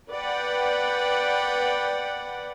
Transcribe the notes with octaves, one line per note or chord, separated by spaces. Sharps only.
B4 D5 F#5 G5